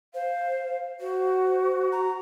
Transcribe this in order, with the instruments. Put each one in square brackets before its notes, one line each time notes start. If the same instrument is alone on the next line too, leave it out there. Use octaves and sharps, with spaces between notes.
[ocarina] C5 [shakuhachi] F5
[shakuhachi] F#4 [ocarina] C5
[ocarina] A#5